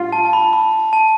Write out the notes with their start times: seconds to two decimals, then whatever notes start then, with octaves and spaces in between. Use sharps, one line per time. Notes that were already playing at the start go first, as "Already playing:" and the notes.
Already playing: F4
0.12 A5
0.25 A5
0.33 B5
0.53 B5
0.93 A5